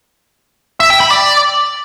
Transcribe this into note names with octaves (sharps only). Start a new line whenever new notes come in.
E5
G5
B5
D5